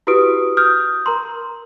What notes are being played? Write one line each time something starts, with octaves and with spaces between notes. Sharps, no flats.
E4 F#4 G4 B4 D#6 D7
D#6 F6 G6
A#4 A#5 C6